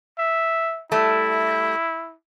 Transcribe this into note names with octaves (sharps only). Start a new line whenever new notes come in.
E5
G3 A3 E4